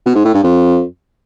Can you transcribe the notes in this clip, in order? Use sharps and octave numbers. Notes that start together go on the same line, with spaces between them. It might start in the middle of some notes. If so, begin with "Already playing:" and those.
B2
G#2
A2
G2
F2